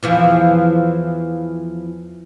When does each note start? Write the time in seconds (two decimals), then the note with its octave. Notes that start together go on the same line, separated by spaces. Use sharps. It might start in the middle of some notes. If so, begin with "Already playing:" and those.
0.03 E2 E3 F3